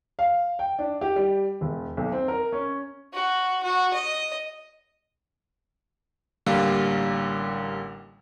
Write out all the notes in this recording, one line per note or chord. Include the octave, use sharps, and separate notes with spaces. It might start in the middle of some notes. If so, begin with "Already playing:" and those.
F5
G5
D4
G4
G3
E1
B1
C4
A#4
C#4
F#4
F#4
D#5
A1 D3 G3 A#3 F5